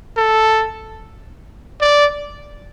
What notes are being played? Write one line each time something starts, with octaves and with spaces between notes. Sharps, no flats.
A4
D5